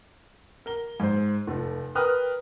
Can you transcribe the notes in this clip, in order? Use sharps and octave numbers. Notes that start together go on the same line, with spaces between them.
A#4 G7
G#2 C5
F1 A3
A#4 B4 G5 D#6 F6 F#6